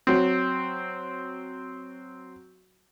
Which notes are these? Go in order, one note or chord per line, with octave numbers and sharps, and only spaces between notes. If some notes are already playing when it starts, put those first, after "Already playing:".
F#3 C4